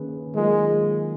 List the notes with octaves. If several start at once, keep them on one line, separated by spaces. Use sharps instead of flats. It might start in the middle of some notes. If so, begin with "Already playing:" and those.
Already playing: D#3 A#3 C#4 G#4 B4
D#3 F#3 G#3 A#3 F4 A#4